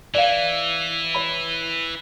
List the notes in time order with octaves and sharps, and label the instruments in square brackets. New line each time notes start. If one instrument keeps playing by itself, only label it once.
[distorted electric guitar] E3 [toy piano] D5 F5
[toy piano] C#5 B5